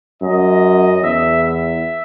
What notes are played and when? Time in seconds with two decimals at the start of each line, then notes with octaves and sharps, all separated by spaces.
0.22 F#2 D#5
1.02 E2 E5
1.43 E5